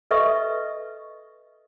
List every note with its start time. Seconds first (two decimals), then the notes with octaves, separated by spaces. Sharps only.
0.11 A4 B4 D#5 E5 C#6